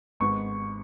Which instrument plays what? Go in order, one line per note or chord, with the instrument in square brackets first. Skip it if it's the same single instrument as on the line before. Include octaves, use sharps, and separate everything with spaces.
[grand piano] G#1 G#2 G#3 B3 [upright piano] C#6